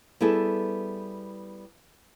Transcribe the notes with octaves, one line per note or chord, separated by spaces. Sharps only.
G3 B3 E4 G#4 A4